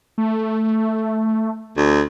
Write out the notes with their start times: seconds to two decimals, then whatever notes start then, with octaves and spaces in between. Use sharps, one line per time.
0.18 A3
1.77 D2